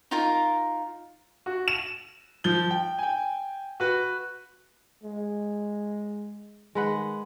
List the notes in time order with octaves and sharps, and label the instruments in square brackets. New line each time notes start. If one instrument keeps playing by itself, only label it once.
[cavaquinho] D#4 F4 A#4
[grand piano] F#4
E7
F3 G6 G7
G5
G5 G#5
F#4 B4
[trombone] G#3
[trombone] D#3 [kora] G#3 B4 F#5